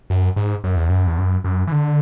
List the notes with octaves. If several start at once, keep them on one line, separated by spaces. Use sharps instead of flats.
F#2
G#2
F#2
E2
F#2
E2
F#2
F#2
E3
D3